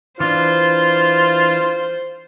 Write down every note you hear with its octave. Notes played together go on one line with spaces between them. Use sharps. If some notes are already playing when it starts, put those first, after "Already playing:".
E3 D4 F4 C5